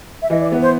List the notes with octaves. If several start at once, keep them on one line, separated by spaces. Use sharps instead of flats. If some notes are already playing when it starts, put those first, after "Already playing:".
E5
E3 D#5
D5
B3
C5